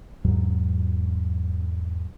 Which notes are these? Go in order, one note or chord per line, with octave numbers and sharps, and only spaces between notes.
E2 G#2 F#3